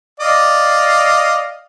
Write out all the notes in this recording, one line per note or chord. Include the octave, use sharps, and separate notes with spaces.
D5 D#5 F5